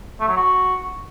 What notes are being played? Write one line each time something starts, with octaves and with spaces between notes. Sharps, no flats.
A3
F#3
F#4